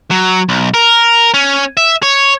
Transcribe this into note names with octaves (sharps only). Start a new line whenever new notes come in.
F#3
B1
A#4
C#4
E5
C#5